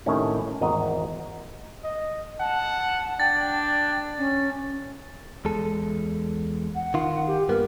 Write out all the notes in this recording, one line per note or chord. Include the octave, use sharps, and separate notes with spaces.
A2 C3 D#3 C#4 E4
G#1 E2 D#5 F#5 A#5
D#5
F#5 A5
D4 G5 A6
C#4
E2 G#3 A4
F#5
D#3 F4
G4
G2 A#3 B3 A#4